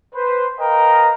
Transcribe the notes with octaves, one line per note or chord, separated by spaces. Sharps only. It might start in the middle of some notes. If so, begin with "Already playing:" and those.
B4 C5
A#4 B4 D#5 F5 G5 A#5